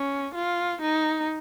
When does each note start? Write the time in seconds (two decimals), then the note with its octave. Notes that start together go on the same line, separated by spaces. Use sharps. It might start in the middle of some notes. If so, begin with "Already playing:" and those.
Already playing: C#4
0.35 F4
0.82 D#4